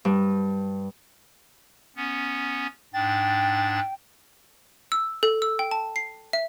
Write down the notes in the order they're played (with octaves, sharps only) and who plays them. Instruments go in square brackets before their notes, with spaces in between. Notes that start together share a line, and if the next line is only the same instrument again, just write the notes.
[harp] G2
[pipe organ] B3 C#4
[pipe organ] G#2 D4 A6 [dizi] G5
[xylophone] E6
A4
E6
G5
A5
C7
E5